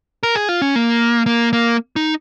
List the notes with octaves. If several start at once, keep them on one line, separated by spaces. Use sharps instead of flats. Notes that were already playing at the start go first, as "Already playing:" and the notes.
A#4
G#4
F4
C#4
A#3
A#3
A#3
D#4